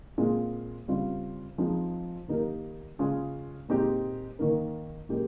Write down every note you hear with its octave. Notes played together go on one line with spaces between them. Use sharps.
A#2 G#3 C4 F4 G#4
C#3 G3 C4 F4
F3 G#3 C4 D#4
D#3 A#3 D#4 G4 A#4
C#3 G#3 C#4 F4 G#4
A#2 G#3 C4 D#4 G4
D#3 A#3 D#4 A#4
A#2 G#3 C#4 G4 A#4